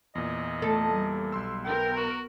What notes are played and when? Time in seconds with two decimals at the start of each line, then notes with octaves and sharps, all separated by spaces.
0.15 E2 A#2 D#5
0.62 A3 A4
0.91 G3
1.32 B1 C6 E6
1.64 B3 A#4 G5
1.97 F#4